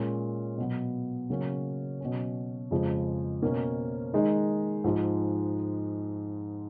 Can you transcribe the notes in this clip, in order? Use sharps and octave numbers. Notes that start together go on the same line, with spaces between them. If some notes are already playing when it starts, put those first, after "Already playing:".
Already playing: A#2 G#3 C#4
B2 F#3 B3
C#3 F#3 A#3 C#4
B2 F#3 C#4
F2 C#3 F3 G#3
B2 A#3 C#4
D#3 G#3 D#4
G#2 F3 G#3